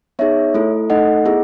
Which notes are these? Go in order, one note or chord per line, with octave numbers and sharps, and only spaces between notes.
B3 D#4 G#4 C#5 E5
A3 E4 A4
A3 D#4 A4 D#5 F#5
B3 E4 G#4